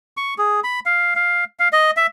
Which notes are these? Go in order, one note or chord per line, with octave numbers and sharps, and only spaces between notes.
C#6
G#4
B5
F5
F5
F5
D#5
E5